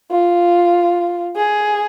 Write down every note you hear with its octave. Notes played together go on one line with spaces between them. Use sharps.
F4
G#4